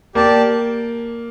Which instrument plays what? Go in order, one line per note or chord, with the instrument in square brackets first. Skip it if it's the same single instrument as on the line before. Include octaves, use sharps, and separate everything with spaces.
[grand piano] A#3 [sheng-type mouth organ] G4 D5 A5